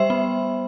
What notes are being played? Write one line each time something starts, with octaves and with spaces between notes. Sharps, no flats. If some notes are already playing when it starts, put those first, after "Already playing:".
Already playing: G3 C5 E5
B3